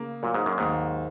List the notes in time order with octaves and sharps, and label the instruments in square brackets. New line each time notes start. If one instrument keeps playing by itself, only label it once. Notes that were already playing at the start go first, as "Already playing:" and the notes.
Already playing: [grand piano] C#3 A#3
[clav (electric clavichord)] A#2 [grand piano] F#3
[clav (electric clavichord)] G#2
F#2
[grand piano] D#2 [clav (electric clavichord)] G#2